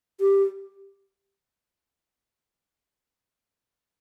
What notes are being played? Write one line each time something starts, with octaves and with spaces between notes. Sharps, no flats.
G4